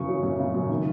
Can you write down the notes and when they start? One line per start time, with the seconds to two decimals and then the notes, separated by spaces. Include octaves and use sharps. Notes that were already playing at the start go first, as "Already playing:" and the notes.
Already playing: F#2 C#3 E3 C#6
0.09 F#3
0.23 F#2
0.40 C#3
0.54 F#2
0.69 D#3